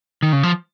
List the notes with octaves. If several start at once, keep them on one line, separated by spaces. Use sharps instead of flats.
D#3
C#3
F3